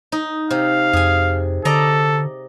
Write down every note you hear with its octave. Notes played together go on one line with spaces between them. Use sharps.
D#4
C3 F5
F2 G#4 G#5
D3 A4 D5 D#5 A#5